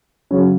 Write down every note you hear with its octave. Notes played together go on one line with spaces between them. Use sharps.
C#3 F#3 C#4